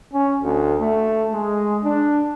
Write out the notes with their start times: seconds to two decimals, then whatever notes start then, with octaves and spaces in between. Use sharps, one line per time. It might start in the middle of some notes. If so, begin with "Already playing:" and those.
0.13 C#4
0.42 D2
0.79 A3
1.32 G#3
1.84 D4